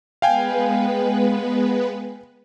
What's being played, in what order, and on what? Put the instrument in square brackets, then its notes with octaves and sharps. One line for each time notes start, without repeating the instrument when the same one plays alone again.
[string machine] G#3 B3 B4 [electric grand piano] F5 G5 G#5